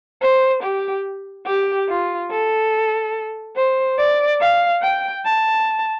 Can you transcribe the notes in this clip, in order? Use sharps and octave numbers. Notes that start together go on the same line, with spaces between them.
C5
G4
G4
F4
A4
C5
D5
F5
G5
A5